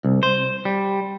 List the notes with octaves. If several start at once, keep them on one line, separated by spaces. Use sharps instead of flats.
C2
C5
G3